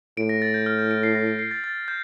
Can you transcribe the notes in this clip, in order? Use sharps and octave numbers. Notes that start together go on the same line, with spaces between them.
A2 D7
A#6
A6
G6
F6
G6
D7
C7
A#6
D7
C7
A6
A6
G6